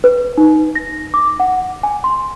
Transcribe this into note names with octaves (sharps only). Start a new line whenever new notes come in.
B4
D#4
A#6
D6
F#5
G#5
C6